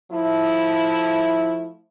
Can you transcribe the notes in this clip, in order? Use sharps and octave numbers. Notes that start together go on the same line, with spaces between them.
F3 A3 E4